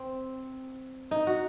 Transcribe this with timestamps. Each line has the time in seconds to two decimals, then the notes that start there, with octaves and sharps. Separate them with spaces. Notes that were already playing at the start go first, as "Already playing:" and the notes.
Already playing: C4
1.11 D#4
1.27 F#4